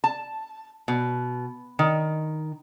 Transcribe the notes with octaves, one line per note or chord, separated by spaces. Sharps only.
A5
B2
D#3